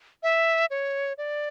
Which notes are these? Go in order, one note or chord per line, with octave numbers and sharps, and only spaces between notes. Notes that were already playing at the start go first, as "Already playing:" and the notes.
E5
C#5
D5